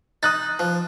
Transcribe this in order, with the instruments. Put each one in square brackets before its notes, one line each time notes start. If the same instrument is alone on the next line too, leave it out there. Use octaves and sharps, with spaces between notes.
[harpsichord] D#4 [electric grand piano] D#6 F#6 A6
[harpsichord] F3